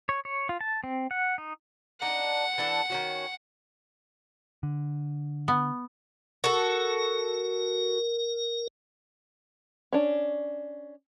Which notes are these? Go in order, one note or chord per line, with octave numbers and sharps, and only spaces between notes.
C#5
C#5
F4
A5
C4
F#5
D#4
D4 D#4 F#5
E3 D4 A4
D#3 C#4 F#4
D3
B3
F#4 A4 A#4
C#4 D4